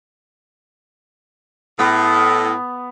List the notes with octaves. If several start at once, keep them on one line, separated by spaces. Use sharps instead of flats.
A2 B3